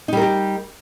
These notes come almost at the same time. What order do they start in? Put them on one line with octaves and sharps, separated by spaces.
D#4 G3 A#4 G4